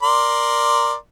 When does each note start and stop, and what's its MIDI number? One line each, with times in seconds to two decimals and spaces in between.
0.03 0.94 70
0.03 0.94 74
0.03 0.94 84